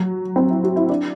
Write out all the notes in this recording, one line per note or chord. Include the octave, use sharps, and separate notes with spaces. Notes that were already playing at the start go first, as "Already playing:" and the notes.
Already playing: F#3
C4
E4
F#4
E4
D4